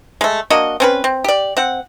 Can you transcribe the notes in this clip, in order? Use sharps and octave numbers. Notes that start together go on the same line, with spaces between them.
G#3 A3
A#3 D4 F#4 D#5
C4 C#4 B4
C4
G4 D5
C4 F#5